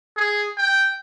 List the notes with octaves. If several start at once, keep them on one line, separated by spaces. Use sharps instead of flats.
G#4
G5